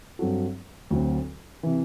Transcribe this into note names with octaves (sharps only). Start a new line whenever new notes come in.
G2 F#3 C4 F#4 A4
D2 D3 F#3 C4
C3 E3